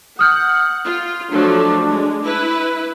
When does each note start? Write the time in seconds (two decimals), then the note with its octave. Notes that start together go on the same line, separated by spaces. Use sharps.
0.19 F#5 D#6 F6 G6
0.85 F4
1.31 F3 F#3 A3 D4
1.89 G#3
2.25 E4 B4